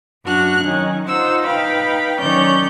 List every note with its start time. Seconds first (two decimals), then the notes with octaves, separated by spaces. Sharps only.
0.24 F#2 D4 F#4 F6 F#6
0.63 D#3 F#3 C#4 D#4
1.07 D#4 F4 C5 F#5 E6
1.46 D#4 B4 F5 G5 B5
2.21 D#3 F#3 C#4 C#5 D5 G6